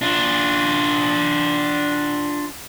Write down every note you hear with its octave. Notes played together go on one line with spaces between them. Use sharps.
D4 F4